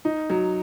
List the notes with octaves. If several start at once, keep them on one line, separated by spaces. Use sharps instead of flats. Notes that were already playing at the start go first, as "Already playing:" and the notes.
D#4
F#3